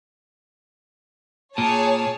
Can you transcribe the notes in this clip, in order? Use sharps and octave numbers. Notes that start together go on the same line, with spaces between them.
A#2 G#4 C#5 A5